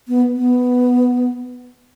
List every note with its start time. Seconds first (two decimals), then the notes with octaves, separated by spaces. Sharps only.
0.08 B3
0.37 B3